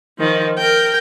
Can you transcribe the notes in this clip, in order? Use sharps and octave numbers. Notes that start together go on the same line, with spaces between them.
D#3 F3
A#4 G5